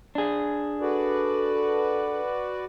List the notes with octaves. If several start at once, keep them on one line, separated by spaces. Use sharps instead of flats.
D4 G#4
F#4 A4 B4 D5